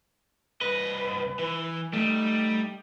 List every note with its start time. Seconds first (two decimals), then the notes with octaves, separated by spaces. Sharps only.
0.61 C2 B4 D#5
1.39 E3
1.93 G3 A3 D#4